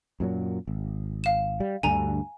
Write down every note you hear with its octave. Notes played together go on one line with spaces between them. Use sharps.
F#2 A#2 F#3
G#1
F5 E7
G3
D2 G2 D3 G#5 A#5